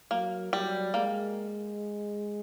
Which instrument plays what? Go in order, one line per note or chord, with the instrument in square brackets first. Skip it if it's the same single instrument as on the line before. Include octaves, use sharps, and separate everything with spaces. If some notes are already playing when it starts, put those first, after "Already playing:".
[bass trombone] F#3 [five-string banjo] A#3
[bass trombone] F#3 [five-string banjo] G3
[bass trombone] G#3 [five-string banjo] A#3